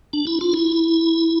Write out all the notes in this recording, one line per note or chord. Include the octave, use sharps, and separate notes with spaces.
D4
E4
F4
E4